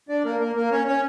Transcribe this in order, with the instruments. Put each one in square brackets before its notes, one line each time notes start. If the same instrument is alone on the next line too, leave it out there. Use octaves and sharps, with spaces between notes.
[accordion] D4 D5
A#3 A#4
A#3 A#4
A#3 A#4
C#4 C#5
C#4 C#5